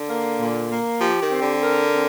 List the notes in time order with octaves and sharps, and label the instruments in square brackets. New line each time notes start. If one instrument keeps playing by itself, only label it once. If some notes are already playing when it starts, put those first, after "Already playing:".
Already playing: [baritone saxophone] D3
[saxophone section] A#3
A#2
A#3
[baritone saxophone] F3 [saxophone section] G4
[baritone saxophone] D#3
[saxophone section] C4
[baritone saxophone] D3
[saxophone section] A#4
C4